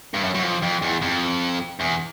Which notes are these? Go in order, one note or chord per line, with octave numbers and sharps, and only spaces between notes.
G2
F#2
F#2
F2
F2
E2
F2
E2